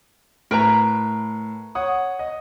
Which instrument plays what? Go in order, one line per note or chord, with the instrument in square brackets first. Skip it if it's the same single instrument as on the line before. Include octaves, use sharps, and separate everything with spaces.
[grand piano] A2 [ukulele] A#4 B4 A#5
[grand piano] C#5 F#5 D#6
D#5